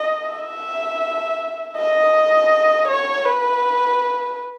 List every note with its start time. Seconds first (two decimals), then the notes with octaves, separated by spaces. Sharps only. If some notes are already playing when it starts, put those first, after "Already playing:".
Already playing: D#5
0.30 E5
1.77 D#5
2.88 C#5
3.24 B4